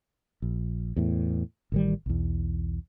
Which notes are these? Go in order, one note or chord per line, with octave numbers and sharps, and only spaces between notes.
A#1
E2 A2
A1 D#3 G3
B1 E2